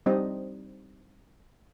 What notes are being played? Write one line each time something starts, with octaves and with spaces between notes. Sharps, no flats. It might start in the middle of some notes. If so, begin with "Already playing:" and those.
G3 C4 D#4 D#5